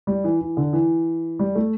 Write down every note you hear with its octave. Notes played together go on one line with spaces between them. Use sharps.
G3
E3
E3
D3
E3
G3
A3